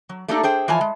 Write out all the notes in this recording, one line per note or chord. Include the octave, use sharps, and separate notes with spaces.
F#3
A3 A#3 D4 D#4 G4 A4
G#4 C5 G5
E3 F3 F4 C#5 G#5 A5
G#3